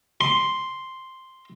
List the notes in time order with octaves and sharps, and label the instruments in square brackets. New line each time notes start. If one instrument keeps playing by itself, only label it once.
[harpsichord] C6